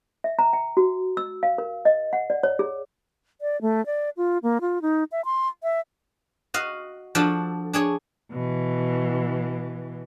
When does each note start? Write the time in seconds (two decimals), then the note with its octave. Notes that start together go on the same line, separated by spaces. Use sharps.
0.24 E5
0.39 A#5
0.53 G5
0.77 F#4
1.17 E6
1.43 F5
1.58 A#4
1.85 D#5
2.13 F#5
2.30 D5
2.43 C#5
2.59 G#4
3.41 D5
3.62 A3
3.86 D5
4.17 F4
4.43 A#3
4.61 F4
4.82 D#4
5.12 E5
5.25 C6
5.63 E5
6.54 F#4 D#5 F5
7.15 F3 D4 F#4 A4
7.73 D4 G#4 C#5
8.32 B2 E3